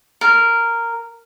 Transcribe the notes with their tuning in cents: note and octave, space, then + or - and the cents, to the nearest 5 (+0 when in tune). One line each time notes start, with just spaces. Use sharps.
A#4 -10